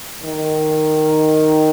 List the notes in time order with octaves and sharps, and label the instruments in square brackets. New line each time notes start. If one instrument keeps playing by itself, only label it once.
[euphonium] D#3